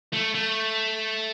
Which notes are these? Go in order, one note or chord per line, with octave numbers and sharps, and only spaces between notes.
A3
A3